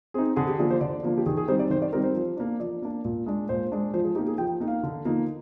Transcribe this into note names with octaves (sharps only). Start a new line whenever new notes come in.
C4 D#4 G#4
D3 G#4
G4
F3 A#3 D4 G#4
C5
D3 D5
F3 A#3 D4
G4
D#3 G#4
G#4
G3 C4 D#4 C5
D5
D#3 C5
D5
G3 C4 D#4 A#4
C5
F3
A#3 D4
F3 D5
A#3 D4
A#2
G#3 D4
A#2 C5
G#3 D4
F3 C5
G#4
A#3 D#4 G4
G#4
F3 G5
A#3 D#4
F5
D3
F3 A#3 D#4